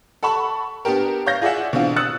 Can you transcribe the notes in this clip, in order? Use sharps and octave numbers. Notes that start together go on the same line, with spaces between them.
A4 F#5 A5 B5 C#6
B3 D4 G4 A#4
C#5 F5 G6 A#6
F4 G#4 D5 E5 F#5
B2 D3 E3 C4 F4
D#6 E6 F#6 A6 C#7